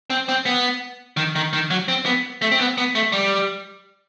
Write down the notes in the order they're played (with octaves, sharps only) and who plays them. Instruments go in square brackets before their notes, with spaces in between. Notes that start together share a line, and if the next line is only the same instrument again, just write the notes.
[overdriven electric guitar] C4
C4
B3
D#3
D#3
D#3
F#3
C4
B3
A3
C4
B3
B3
A3
G3